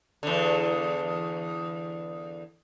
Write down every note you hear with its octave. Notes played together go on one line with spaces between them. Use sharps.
E2 D3